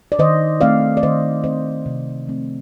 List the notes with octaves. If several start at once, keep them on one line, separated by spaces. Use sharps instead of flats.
D5
D#3 C5 D#5
A3 C4 D5 F5
D5
D#3 C5 D#5
A3 C4 C5 D#5
C3
F3 A3 C4